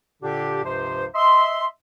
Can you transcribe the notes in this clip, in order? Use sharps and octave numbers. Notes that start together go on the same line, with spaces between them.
A#2 D3 D4 G4
C#2 G2 C3 F3 C5
D#5 E5 C6